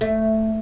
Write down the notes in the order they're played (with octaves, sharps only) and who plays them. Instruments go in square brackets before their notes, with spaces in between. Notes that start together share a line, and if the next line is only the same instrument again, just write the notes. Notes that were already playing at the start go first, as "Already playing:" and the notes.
[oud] A3